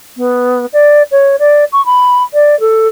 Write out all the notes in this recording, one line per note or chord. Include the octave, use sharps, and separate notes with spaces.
B3
D5
C#5
D5
C#6
B5
D5
A4